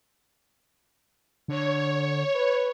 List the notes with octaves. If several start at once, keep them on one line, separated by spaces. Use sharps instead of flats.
D3 C#5
B4